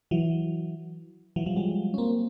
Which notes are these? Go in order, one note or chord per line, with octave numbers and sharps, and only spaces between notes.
E3 F#3
E3 F#3
F3 G3
F#3 G#3
C#4
A#3 C4